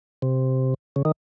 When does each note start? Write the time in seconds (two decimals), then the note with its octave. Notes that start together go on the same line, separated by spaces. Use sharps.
0.22 C3
0.96 C#3
1.05 D#3